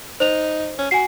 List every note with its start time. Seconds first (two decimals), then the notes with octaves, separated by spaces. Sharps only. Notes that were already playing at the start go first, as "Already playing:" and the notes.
0.20 D#4 C5 F7
0.79 C#4
0.91 F#4 G#5 C7